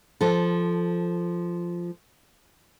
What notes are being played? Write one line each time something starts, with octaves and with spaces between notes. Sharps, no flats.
F3 A4